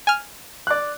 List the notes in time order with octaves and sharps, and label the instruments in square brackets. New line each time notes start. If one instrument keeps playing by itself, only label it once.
[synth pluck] G#5 F6
[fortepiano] D5 F#6